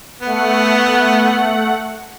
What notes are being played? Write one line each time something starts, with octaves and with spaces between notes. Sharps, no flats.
A3 B3 F#5